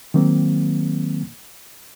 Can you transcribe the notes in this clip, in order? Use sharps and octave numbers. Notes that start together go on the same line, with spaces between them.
D#3 F#3 A#3 C4